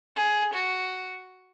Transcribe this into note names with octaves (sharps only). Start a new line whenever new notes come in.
G#4
F#4